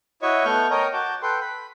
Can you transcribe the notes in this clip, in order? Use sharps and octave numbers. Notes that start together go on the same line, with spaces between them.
E4 F#4 C#5 D#5 E5 C#6
A3 B3 C#6 F6 G6
A#4 C#5 D#5 G5 A#5
F#4 A5 D6 G6
A4 B4 G5 C6
B5